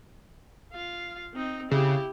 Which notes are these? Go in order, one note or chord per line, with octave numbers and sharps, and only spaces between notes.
F4 F5
C4 D#4
C#3 E4 G4